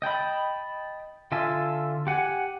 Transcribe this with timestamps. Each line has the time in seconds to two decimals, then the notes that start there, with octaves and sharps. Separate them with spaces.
0.02 D#5 G5 A5 B5
1.32 D3 F4 E5 G#5 A5
2.07 G4 F#5 G#5